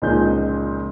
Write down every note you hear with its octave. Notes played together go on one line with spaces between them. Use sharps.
C#2 A#2 F3 D#4 G#5 G6